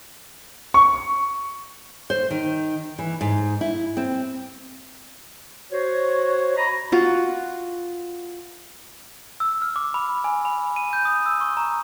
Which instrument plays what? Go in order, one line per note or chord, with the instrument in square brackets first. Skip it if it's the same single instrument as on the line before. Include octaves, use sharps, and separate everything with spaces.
[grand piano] C#6
[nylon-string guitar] C5
D#3
E3
G#2
E4
C4
[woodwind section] F#4 C5 C#5
D#5 A#5 B5
[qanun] F4 F#4
[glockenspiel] E6
F6
D6
B5
G#5
B5
D#7
G6
D#6
E6
C#6
A#5